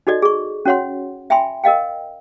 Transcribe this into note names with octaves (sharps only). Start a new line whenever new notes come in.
D#4 F#4 A4 D5 D#5
G#4 C#6
C#4 F#4 C#5 F#5 C6
E5 G5 G#5 B5 C6
A#4 D#5 F5 G5